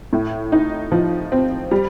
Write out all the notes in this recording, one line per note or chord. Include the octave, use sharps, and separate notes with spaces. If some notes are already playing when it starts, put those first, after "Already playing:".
A2
D#4
F3
C4
G3